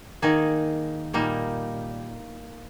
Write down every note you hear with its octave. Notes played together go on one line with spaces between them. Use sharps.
D#3 A#3 D#4 G#4
A#2 G3 A#3 D#4